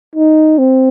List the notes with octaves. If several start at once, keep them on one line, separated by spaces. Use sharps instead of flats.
D#4
C4